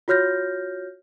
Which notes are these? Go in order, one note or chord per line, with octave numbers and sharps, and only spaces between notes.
F4 F#4 C#5 F6 G6 A#6